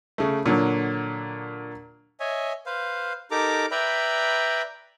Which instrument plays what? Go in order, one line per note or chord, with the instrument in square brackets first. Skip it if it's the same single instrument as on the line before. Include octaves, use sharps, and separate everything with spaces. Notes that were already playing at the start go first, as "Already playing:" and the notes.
[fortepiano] C#3 A3
A#2 D3 F#3
[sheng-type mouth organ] C#5 D#5 E5 G#5
B4 C5 F5
D#4 G4 A4 A#4 A#5 D6
B4 D5 E5 G5 A#5 B5